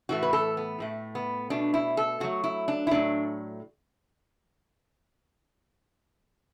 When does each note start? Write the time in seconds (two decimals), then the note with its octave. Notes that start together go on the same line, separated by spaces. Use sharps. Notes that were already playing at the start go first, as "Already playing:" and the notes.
0.09 A2 E3 A3 F#4
0.23 B4
0.33 A4
0.57 B3
0.80 A2 A3
1.15 B3
1.50 B2 A3 D4
1.74 E4
1.97 A4
2.20 B2 F#3 A3 F#4
2.44 E4
2.68 D4
2.87 E4
2.91 A2 F#3 A3 D4